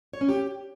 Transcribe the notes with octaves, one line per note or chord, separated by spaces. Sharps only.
C#5
C#4
G4